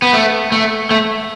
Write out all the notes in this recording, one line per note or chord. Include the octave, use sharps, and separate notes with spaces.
B3
A3
A3
A3